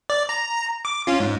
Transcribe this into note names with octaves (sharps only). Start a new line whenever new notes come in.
D5
A#5
D6
C#4 F4
G#2